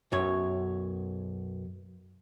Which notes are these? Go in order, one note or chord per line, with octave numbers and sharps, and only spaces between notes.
B1 F#2 C#5